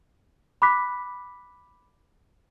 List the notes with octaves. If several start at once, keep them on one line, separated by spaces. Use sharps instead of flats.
B5 D6 F#6 B6